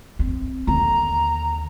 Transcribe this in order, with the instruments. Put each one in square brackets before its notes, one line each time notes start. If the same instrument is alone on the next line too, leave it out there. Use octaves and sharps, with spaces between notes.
[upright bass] C4
[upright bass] D#2 D3 [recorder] A#5